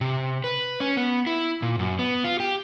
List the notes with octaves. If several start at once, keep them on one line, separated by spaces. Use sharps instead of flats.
C3
B4
C#4
B3
E4
A#2
F#2
B3
F4
G4